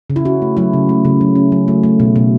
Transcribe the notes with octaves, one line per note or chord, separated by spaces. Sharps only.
C#3
E4
C#4 F#4
A3
F#3 E4
C#3
A3
C#3
F#3
C#4
F#3
A3
A3
B2
B2